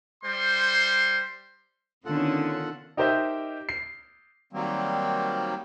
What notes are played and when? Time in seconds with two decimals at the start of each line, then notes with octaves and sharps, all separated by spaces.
0.24 G3 C5 C6
2.05 D3 D#3 B3 C#4 F4 A4 F#5
2.97 D#4 G4 A#4 C5 D#5 E5
3.69 C7
4.53 D#3 F#3 G3 A#3 C4